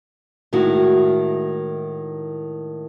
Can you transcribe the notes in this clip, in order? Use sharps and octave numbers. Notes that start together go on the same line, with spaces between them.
A2 D#3 G#3 E4 F#4